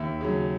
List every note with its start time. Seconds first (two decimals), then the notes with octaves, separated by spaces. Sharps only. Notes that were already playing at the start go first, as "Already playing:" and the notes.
Already playing: D#2 E5
0.21 C#3 F#3